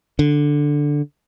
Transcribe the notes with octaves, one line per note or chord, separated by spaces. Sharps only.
D3